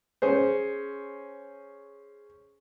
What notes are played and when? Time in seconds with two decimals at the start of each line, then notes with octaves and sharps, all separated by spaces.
0.22 C#4 G#4 C5